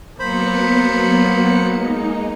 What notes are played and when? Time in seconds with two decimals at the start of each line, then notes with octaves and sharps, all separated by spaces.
0.19 F#3 A#3 B3 C5 B5 C#7
1.71 G#3 D#4